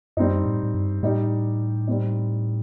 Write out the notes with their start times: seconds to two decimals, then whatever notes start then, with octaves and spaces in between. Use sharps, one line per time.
0.17 F#2 G3 C4 D#4
0.45 A2
0.63 A2
0.74 G2
1.03 A2 G3 D#4 G4
1.87 G3 C4 D#4